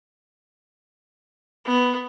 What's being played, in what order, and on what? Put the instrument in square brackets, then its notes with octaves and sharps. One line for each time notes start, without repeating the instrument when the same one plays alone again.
[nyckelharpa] B3